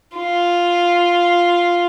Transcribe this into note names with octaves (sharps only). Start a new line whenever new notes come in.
F4